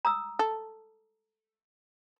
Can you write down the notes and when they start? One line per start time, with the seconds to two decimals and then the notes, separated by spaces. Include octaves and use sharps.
0.05 A#5 D#6 E6
0.39 A4